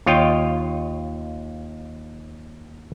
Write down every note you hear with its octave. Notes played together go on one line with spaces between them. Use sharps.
D#2 F4 C#5 D#5 G5